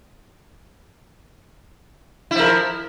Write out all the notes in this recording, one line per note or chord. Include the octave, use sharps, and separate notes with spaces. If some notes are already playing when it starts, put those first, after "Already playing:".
F3 E4 A#4